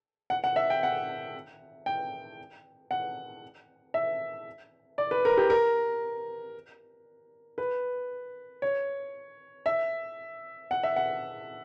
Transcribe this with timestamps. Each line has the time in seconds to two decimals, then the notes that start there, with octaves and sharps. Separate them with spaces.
0.30 F#5
0.44 F#5
0.56 E5
0.70 G5
0.83 F#5
1.86 G5
2.91 F#5
3.94 E5
4.98 D5
5.11 B4
5.25 A#4
5.37 G4
5.50 A#4
7.58 B4
8.62 C#5
9.66 E5
10.71 F#5
10.83 E5
10.96 F#5